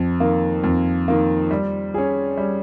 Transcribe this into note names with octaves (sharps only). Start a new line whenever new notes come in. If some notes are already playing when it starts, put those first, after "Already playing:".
Already playing: F2
D#3 A#3
F2
D#3 A#3
G3
C#4 G#4
G3